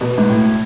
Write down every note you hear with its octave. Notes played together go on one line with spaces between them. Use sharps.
B2
G#2
A2